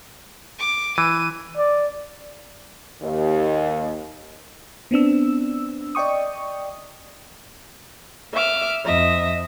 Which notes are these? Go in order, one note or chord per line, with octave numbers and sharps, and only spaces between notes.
D6
E3 D#7
D5
D#2
B3 C4 D4 E6
D5 D#5 G5 C#6 D#6
E5 D6 F6
F2 D#5 E5 A#6